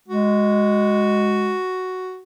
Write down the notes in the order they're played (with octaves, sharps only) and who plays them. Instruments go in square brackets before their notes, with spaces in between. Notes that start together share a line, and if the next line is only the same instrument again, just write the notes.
[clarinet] G#3 [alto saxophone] F#4